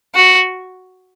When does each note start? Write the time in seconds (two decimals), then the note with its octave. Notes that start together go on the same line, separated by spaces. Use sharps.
0.15 F#4